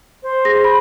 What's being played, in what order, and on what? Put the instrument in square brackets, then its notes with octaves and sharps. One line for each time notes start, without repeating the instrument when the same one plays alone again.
[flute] C5
[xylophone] G#4 A#6
B5